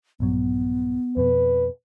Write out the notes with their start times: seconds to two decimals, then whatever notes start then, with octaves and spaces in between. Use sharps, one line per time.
0.20 A#1 G2 F#3 B3
1.17 F2 B2 B4